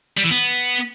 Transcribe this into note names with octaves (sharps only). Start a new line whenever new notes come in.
G3
E3
B3